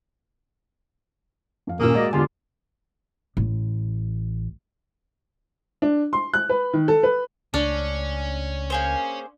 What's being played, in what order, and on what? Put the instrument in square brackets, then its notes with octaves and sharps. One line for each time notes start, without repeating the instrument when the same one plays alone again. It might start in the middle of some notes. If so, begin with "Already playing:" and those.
[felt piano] F2 F5
[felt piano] D#1 A#2 [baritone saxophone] A#3 [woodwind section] C#4 [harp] D#6 E6
[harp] G#2 G#4 [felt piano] F#4 [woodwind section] D5 D#5
[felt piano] E2 G#5 [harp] D3 [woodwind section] F4 G4
[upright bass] A1
[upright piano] D4
C6
F#6
B4
D#3
A4
B4
[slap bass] C#2 A3 [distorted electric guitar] C#4 [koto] D4
[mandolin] A#3 G#4 C5